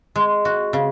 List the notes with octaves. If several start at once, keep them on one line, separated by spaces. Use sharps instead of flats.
G#3
F#4
C#3